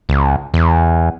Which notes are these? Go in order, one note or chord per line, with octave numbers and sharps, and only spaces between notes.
C#2
E2